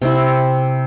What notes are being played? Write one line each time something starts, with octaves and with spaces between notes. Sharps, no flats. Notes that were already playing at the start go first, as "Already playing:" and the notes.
C3 C4 E4